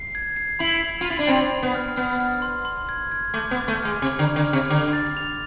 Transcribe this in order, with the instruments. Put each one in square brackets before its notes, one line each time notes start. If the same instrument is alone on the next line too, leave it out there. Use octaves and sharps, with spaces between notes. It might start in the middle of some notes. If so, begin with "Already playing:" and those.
Already playing: [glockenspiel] C7
G#6
C7
[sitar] E4 [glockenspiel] B5
[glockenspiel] B5
[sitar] F4
[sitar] E4 [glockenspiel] B5
[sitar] D4
[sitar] C4 [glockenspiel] B5
[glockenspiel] B5
[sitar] B3
[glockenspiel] F6
[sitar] B3 [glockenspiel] F6
[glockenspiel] F6
C6
C6
G#6
G#6
[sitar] A3 [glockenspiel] D6
[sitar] B3
[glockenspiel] D6
[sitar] A3
[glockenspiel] F6
[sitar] G#3
[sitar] C3 [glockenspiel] D6
[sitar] D3
[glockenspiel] B5
[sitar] D3
[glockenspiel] F6
[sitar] C3
[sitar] D3 [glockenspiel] D6
[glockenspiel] A6
F7